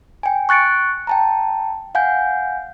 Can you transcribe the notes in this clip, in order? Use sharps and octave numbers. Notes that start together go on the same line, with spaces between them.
G5 G#5
C#6 F#6 A6 C#7 D7
G5 A5 A#5
F5 F#5 G#5 G6